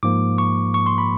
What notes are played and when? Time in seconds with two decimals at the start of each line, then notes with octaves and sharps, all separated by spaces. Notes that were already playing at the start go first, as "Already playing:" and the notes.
0.03 G#2 F3 A#3 D6
0.38 C#6
0.74 C#6
0.86 C6
0.98 B5